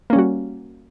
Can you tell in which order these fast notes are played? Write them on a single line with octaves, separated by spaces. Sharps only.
A#3 C#4 G3 F#4